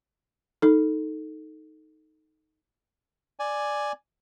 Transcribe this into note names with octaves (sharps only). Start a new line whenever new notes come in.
D#4 A4
D5 G#5